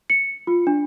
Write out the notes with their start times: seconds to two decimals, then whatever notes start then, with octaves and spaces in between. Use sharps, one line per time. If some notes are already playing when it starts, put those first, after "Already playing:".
0.10 C#7
0.47 F4
0.67 D4